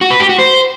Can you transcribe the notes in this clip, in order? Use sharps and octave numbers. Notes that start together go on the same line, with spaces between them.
F#4
B4
G4
F#4
C5